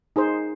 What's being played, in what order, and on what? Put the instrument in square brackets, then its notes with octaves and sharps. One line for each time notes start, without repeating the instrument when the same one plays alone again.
[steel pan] D#4 G#4 C5